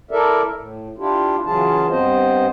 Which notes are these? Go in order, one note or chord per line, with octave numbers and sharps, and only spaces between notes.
E4 A4 A#4 D5 E5
A2
D4 E4 F4 G4
C#3 E3 F#3 F4 G#4 A5
G2 B3 C4 C5 D#5